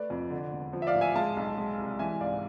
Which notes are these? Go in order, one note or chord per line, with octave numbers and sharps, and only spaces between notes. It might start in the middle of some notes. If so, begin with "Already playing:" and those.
Already playing: A3 B4 D5
F2
D3
E1
F3
E5
D5 F5
A1
E5 G#5
G#3 F5 A5
B1
G#3
C2
E3 E5 G#5
G#1 D5 F5